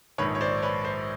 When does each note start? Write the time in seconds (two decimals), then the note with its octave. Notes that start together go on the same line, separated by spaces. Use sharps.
0.18 A#1 G#2 D#3 B4 C#5
0.35 C#5
0.41 C5 D5
0.62 B4 C#5
0.85 C5